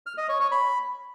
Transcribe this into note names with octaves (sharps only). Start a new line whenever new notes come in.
F6
D#5
C#5
C#5
B5